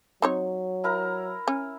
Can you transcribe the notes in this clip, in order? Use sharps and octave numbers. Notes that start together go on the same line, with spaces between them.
F#3 C4 D#4 C#5
E4 A#4 A#5
C#4